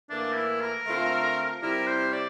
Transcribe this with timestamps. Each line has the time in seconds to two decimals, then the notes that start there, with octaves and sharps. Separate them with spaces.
0.10 A2 E3 A#3 D4
0.35 E4
0.61 A#4
0.87 D3 A3 C4 F4
1.62 C3 G3 C4 E4 A#4
1.88 C5
2.13 D5